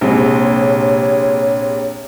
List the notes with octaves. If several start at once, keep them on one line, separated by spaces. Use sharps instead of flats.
A#1 C3 G#3 C#5